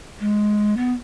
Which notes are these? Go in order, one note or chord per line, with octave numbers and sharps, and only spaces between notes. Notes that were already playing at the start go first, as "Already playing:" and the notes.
G#3
B3